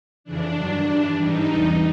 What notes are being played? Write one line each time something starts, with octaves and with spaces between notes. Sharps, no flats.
F2 C#3 E3 D4
G2 D#3 F#3
G2 E3 G3
G#2 E3 G3 D#4
E2 C3 E3 G3